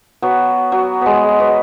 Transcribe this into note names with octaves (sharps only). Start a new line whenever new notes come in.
F#3 B3
F#3
G#3 B3
G#3
F#3 B3